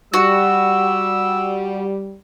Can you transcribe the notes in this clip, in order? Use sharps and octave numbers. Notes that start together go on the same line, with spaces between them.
G3 F#4 E6